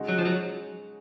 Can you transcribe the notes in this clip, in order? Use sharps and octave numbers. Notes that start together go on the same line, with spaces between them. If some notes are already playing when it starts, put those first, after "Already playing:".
Already playing: C#3 G#3 D#4 F#4
F#3
F3
F#3